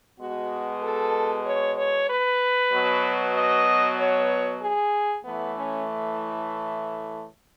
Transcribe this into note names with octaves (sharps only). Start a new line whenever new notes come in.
B2 G#3 B3 F#4
A4
C#5
C#5
B4
B2 F#3 B3
D#5
C#5
G#4
A2 E3 A3 B3
C#4